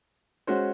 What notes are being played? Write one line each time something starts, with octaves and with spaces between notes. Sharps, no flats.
G#3 C#4 F#4 C5